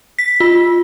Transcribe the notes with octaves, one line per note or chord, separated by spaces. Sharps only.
B6
F4